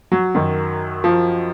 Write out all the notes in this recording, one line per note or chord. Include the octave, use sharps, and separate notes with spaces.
F#3
F#2 D#3
F3